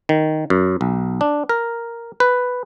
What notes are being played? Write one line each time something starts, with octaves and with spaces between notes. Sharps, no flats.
D#3
F#2
B1
D4
A#4
B4